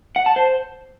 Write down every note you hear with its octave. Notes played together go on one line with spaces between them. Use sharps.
F#5
A5
C5